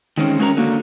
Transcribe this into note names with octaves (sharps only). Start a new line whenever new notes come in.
D#3 G#3 C4 C#4
G#3 C#4 F#4 A#4 C#5 A#5
D3 A#3 F#4